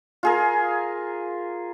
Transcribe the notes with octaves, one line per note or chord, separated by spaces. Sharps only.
F4 G#4 A#4